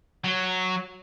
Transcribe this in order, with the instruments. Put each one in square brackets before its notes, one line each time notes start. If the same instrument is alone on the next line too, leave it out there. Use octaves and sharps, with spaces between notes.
[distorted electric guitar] F#3